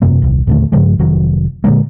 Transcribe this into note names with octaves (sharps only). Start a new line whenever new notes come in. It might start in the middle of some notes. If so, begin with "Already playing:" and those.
E1 F#2 C3 A#3
D#1 C2
D#2 A#2 D3 A3
G2 C#3 F3 G#3
F1 D#3 F#3
A#2 D3 G#3 A#3